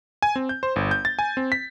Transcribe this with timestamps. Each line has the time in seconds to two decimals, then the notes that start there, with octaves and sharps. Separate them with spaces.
0.22 G#5
0.36 C4
0.49 G6
0.63 C5
0.76 G1
0.91 G6
1.05 A6
1.19 G#5
1.37 C4
1.52 B6